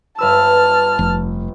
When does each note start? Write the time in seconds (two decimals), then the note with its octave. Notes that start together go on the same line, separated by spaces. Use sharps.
0.18 G1 B4 A5 E6 F6
0.99 F1